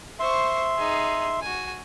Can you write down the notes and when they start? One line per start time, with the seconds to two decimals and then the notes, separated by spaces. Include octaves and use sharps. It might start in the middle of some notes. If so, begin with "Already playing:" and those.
0.19 C5 E5 C6 C#6
0.78 D#4 G#4
1.42 F#4 G#5